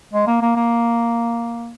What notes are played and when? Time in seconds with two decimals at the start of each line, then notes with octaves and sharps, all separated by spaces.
0.13 G#3
0.27 A#3
0.42 A#3
0.56 A#3